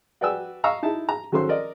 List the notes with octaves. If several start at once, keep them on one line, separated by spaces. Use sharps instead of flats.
F#4 B4 D5 G5 G#5 E6
D#5 F5 A#5 C#6 E6
D#4 E4 A5
A#5
D#3 F#3 C#4 A4 C5 C6
A#4 D5 D#5